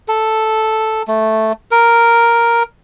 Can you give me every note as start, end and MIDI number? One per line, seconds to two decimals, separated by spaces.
0.08 1.03 69
1.08 1.52 57
1.71 2.63 70